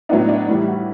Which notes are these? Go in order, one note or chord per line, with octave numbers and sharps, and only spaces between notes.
A2 F#3 B3 D4 D#4
D4
A2 E3 G3 E4
F#4